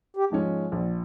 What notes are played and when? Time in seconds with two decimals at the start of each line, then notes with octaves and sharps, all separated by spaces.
0.17 G4
0.30 G#2 F3 G#3 C#4
0.72 A#1